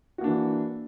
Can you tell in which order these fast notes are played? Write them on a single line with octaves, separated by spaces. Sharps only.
F#4 A#3 D4 E3